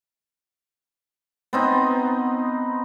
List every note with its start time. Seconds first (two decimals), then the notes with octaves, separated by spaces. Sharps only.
1.53 B3 C4 D#4